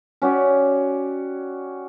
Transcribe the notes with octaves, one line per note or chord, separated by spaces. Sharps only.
C#4 F#4 G4 D5